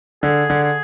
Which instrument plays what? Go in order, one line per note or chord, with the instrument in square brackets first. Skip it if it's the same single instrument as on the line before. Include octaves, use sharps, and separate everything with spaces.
[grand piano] D3 [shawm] G#4
[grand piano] D3
[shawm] G#4